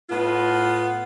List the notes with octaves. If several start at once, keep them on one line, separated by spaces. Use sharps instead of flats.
A2 B3 F4